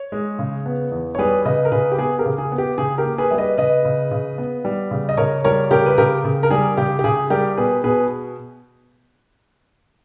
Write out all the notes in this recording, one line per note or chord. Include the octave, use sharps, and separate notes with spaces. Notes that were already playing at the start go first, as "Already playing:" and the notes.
Already playing: C#5
G#3
C#3
B3
E2
C#5
G3 G#4 B4
C#3 B4 D#5
A#4
C#3 G#4 B4
G4
B3 G#4
G4 A#4
C#3
G#4
B3
G4
C#3 G#4
G4 A#4
A#3
G#4 B4
G3 E5
B4 D#5
C#3 B4 D#5
C#3
C#3
B3
G3
C#3
D#5
C#3 A#4 C#5
G3 A#4 C#5
C#3 G4 A#4
B4
C#3 G4 A#4
C#3
A#4
G3 G#4
C#3 G4
G4
C#3 G#4
G3 G4 A#4
B2 G#4 B4
B2 G#4 B4